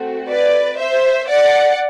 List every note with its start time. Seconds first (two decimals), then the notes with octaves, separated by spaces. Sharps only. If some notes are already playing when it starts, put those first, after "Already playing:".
Already playing: A3 C4 F#4
0.28 B4 D5
0.78 C5 E5
1.28 D5 F#5